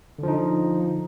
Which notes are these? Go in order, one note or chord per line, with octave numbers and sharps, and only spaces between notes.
D3 F3 D#4